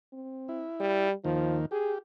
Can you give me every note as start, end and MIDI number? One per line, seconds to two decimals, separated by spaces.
0.13 0.64 60
0.48 1.08 64
0.80 1.13 55
1.25 1.66 39
1.25 1.66 51
1.25 1.60 53
1.72 1.98 67
1.72 1.94 68